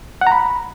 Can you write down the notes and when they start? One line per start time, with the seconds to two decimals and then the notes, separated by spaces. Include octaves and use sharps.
0.21 F#5
0.27 A#5
0.32 B5